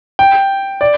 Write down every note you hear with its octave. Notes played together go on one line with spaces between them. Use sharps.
G5
D5